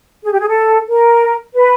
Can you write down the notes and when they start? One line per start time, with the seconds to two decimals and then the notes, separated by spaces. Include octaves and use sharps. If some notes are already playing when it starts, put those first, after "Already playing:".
0.24 G#4
0.32 G4
0.40 G#4
0.49 A4
0.89 A#4
1.54 B4